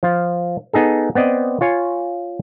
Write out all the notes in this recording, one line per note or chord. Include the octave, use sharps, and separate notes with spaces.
F3 F4
B3 D#4 G#4 A4
B3 C4 D5 D#5
F4 C#5 G#5